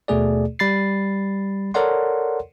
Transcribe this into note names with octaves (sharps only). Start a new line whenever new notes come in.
D#2 B2 A3 G#4 D5
G3 B5 A6 C7
A4 A#4 C#5 D5 F#5 C6